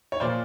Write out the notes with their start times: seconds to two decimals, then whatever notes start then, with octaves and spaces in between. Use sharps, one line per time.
0.12 C#5
0.20 A#2 F3 C5 D5